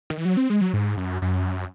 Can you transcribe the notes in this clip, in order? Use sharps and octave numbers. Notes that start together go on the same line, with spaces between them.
D#3
E3
F#3
C4
G#3
F#3
G#2
F#2
F#2